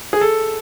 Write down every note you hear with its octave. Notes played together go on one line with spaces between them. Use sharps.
G#4
A4